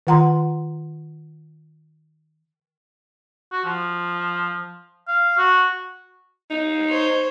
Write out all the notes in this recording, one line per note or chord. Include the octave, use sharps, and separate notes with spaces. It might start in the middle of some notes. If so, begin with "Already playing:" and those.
D#3 F4 F#5 A#5 C6
F#4
F3
F5
F#4
D#4
C5 C#5